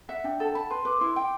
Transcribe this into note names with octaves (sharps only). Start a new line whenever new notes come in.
E5 F#5
D4 G5
A4 A5
A5 B5
B4 C6
B4 D6
E4 C6
G5